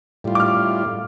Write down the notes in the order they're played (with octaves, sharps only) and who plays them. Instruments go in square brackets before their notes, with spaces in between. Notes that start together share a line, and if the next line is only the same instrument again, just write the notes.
[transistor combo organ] A2 G3 F4
[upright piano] D6
F6